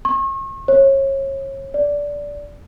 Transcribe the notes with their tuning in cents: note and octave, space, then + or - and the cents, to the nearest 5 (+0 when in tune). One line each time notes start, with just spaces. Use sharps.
C#6 -40
C#5 -30
D5 -15